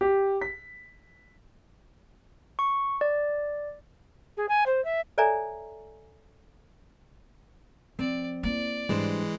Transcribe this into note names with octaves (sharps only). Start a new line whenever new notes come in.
G4
B6
C#6
D5
G#4
G#5
C5
E5
A4 C#5 D5 E5 G#5 A#5
F3 C4 D5
A#3 E4 D5
G#2 E3 G3 G#3 D4 C5